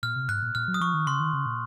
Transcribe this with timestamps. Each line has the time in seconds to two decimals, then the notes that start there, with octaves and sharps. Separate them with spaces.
0.03 A#2 F6
0.16 C3
0.29 G#2 F#6
0.42 A#2
0.55 A#2 F6
0.68 F#3
0.74 D#6
0.81 F3 C#6
0.94 D#3
1.07 C#3 C6
1.20 D#3
1.33 C#3
1.46 A#2